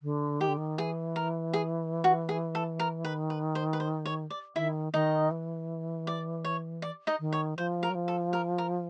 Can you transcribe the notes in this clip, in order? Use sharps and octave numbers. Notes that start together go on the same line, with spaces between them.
D3
D#3 G4
D3
D#3
E3 G#4
A#4
G#4
F#4
G#4
A4
A#4
D#3 B4
B4
C5
B4
C5
C#5
D5
D#3 E4 E5
D#3 D#4 D#5
E3
D5
C#5
D5
D#4 D#5
D#3
C#5
F3 C5
A#4
F#3
F3
A4
A#4
A#4